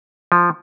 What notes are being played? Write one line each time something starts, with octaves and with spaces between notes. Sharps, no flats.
F3